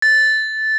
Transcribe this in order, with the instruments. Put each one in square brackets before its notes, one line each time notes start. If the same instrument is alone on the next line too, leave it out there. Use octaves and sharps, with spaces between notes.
[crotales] A6